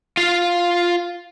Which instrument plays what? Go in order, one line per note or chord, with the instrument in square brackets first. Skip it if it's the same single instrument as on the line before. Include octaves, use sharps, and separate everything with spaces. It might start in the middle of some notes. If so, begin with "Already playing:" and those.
[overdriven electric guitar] F4 F5